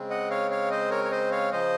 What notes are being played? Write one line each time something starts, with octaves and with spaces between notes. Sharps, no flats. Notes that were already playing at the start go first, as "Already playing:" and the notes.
Already playing: C#3 G#3 C4
D#5 F#5
C#5 F5
C#5 F5
C5 D#5
A#4 C#5
C#5
C5 D#5
C#5 F5
C#3 F3 C5 D#5